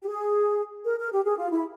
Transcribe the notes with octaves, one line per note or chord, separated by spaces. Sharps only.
G4
G#4
A#4
A#4
G4
G#4
F4
E4